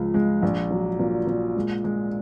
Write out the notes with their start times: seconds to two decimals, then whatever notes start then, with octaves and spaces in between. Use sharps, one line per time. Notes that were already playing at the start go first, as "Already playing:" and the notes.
Already playing: C#2 F3 G#3
0.14 G#3
0.42 A#1
0.71 F#3
0.99 A#2
1.27 A#2
1.56 G#3
1.84 G#3